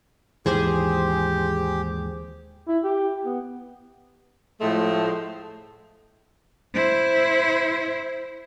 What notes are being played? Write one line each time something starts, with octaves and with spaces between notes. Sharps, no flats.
D#2 G#2 E3 G4 G#4 C5
E4
G4
B3
A2 F3 G#3 A3
E4 C5